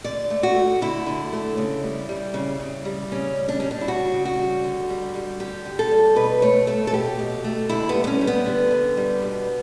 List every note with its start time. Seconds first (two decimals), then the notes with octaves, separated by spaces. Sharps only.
0.04 D3 D5
0.30 A3
0.43 F#4
0.56 A3
0.81 D3 E4
1.06 D3
1.33 A3
1.57 C#3
1.83 G3
2.09 G3
2.34 C#3
2.60 C#3
2.85 G3
3.11 C#3 C#4
3.36 G3
3.49 D4
3.60 G3 C#4
3.71 D4
3.81 E4
3.87 C#3 F#4
4.12 C#3
4.25 F#4
4.39 G3
4.64 D3
4.90 G3
5.15 G3
5.40 D3 G4
5.65 D3
5.79 A4
5.91 G3
6.16 B2 B4
6.42 A3 C#5
6.67 A3 A4
6.87 A4
6.93 B2 G4
7.19 B2
7.44 A3
7.69 D3 E4
7.89 B3
7.94 G3
8.04 B3
8.07 C#4
8.21 G3
8.27 B3
8.46 D3
8.71 D3
8.97 G3
9.22 B2